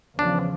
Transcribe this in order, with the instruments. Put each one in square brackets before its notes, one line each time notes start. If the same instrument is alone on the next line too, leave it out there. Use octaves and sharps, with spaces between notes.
[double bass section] E2 C#3 F3 [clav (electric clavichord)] D4